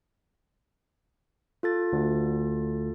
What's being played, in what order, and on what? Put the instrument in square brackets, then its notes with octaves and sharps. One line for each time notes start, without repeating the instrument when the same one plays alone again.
[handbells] F4 A4 A6
[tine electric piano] D2